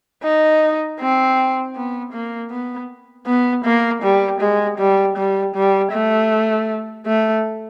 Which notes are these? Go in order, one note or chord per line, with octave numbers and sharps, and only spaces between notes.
D#4
C4
B3
A#3
B3
B3
A#3
G3
G#3
G3
G3
G3
A3
A3